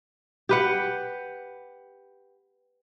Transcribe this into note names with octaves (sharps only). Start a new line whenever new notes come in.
G4 B4 F#5